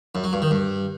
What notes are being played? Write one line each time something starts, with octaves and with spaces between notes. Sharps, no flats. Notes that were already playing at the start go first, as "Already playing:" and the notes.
F#2
F#3
G2
D#3
G2